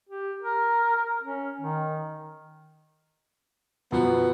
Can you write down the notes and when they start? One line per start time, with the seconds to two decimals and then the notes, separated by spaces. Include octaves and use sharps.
0.09 G4
0.42 A#4
1.23 C#4
1.61 D#3
3.92 F#2 B2 F3 B3